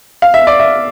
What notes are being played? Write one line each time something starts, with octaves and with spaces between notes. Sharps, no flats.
F5
E5
D5
E5